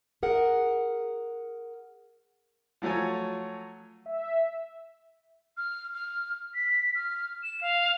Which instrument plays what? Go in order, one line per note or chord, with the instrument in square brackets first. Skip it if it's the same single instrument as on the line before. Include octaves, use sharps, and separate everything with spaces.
[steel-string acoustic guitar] G#4 A#4 F#5
[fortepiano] F3 F#3 A3 C#5 G#5
[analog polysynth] E5
[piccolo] F6
F6
B6
F6
E7
F5